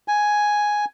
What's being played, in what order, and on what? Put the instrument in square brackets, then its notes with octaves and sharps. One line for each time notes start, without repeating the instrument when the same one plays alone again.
[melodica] G#5